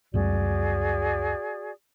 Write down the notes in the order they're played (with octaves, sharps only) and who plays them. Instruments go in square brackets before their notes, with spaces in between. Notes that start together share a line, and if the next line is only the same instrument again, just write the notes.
[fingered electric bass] C#2 F#2 G3 [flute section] F#4 G#4 D5